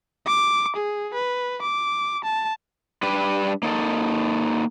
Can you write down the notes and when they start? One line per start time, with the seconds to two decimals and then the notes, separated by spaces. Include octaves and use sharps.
0.27 D6
0.76 G#4
1.14 B4
1.62 D6
2.24 A5
3.03 G3 D4 G4 B4
3.63 A#3 D#4 A4